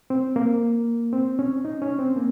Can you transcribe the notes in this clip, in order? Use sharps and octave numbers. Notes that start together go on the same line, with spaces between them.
C4
A#3
C4
C#4
D#4
C#4
C4
A#3